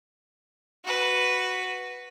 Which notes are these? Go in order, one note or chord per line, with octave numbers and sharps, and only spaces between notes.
F#4 B4